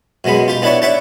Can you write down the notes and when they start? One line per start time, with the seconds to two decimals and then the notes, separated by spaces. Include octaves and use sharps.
0.24 F#2 B2 G#3 B3 B5
0.48 F4 G4
0.62 B3 D4 E4 B4 C#5 A5
0.82 D4 C#5 E5 F#5 G5 A5